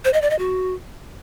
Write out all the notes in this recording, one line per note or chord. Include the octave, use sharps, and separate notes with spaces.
C5
D#5
D5
D#5
F#4